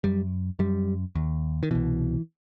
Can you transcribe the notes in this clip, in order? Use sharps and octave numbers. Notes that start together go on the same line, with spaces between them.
F#2 G3
F#2 G3
D#2
D#3
C2 B2 E3